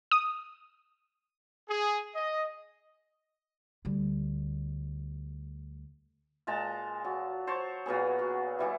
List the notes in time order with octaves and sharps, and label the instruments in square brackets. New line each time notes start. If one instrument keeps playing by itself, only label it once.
[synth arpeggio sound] D#6
[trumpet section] G#4
D#5
[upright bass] D2 G3
[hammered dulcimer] A#2 G#3 A5 A#5
F#3
C5 C#5 A5 A#5
A#2 F#3 B3 G#4
F#4
E3 G3 E4